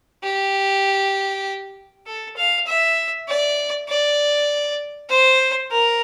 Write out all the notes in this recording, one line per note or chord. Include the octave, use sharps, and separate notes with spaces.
G4
A4
F5
E5
D5
D5
C5
A#4